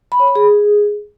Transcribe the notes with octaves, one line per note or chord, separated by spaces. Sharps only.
B5
C#5
B5
G#4